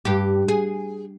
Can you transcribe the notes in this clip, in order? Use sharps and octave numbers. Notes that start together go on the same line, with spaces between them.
G2 G4
G#4